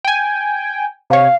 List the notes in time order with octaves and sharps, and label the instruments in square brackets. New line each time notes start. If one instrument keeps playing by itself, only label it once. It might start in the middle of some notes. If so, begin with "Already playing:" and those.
[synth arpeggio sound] G5 G#5
[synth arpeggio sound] C3 C#5 [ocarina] F5